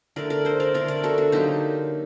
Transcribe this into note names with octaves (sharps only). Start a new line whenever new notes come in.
D3 A3 A#4 D5
A#4 D5
A4 C5
A#4 D5
D3 A3 A#4 D5
A#4 D5
F#4 A4
D4 F#4
D3 F#3 A#3 D#4 G4